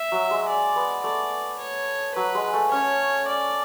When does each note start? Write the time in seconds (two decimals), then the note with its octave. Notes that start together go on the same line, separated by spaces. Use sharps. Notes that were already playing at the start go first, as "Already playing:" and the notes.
Already playing: E5
0.12 F#3
0.31 G#3
0.49 D5
0.76 B3
1.04 A3 D5
1.60 C#5
2.15 F#3 B4
2.35 G#3
2.53 A3
2.71 C#4 C#5
3.27 D5